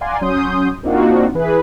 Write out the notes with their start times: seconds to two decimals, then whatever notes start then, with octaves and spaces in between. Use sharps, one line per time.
0.01 D5 F5 F#5 G#5 A#5 C6
0.21 F#3 C#4 C6 D#6 G6
0.83 A#3 C4 D4 D#4 F4 F#4
1.34 E3 G#4 B4